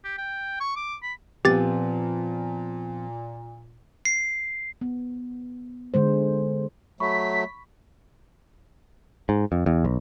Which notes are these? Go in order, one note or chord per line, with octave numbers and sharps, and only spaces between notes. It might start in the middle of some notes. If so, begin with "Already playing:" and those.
G4
G5
C#6
D6
B5
A#2 F3 B3 C4 G4 A6
C7
B3
D3 G#3 C5
F#3 A3 B5 C#6 B6
G#2
F2
E2
B1